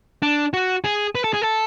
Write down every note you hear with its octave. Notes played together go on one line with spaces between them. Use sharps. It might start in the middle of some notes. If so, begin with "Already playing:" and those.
D4
F#4
G#4
B4
A4
G#4
A4